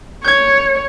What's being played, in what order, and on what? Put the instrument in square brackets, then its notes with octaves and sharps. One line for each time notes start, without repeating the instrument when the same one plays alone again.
[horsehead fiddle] C#5 [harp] G6 G#6